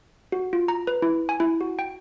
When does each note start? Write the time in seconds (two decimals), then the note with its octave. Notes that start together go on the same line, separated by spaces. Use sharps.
0.32 F#4
0.53 F4
0.68 A#5
0.87 B4
1.02 E4
1.29 G#5
1.40 E4
1.61 F#4
1.79 G5